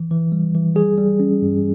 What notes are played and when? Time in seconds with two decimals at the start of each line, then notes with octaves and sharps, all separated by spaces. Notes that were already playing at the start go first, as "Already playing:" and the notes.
Already playing: E3
0.11 E3
0.32 G3
0.55 E3
0.75 G3 G#4
0.98 G3
1.20 C#4
1.42 G2